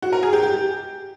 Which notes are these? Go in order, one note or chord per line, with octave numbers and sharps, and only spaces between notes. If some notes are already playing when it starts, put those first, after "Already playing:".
F#4
A#4
G#4
G4
G4